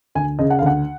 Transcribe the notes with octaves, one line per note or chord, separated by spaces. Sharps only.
D2 G#5
C#3 D#5
F#5
F5
D2 F#5